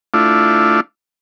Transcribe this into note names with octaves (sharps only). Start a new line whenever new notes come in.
A3 D4 E4 F4